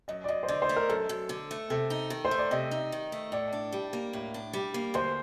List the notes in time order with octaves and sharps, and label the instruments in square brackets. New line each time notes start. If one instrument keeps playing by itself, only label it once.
[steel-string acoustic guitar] F#2 [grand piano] D#5
[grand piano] D5
[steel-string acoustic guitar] F#2 [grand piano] D#5
[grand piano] C5
[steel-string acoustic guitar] D3 [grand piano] D5
[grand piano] C5
[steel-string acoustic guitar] A3
[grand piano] A#4
[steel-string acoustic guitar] F#2 [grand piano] A4
[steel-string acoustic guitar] F#2
D3
A3
[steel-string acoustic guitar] C3 [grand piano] A4
[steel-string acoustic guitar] D#4
D#3
[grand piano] C5
[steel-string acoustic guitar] A3
[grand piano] D5
[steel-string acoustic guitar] C3 [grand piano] D#5
[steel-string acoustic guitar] D#4
D#3
A3
[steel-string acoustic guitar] A2 [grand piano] D5
[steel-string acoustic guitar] D4
G3
A#3
A2
D4
G3
A#3
[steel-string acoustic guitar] D2 [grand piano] C5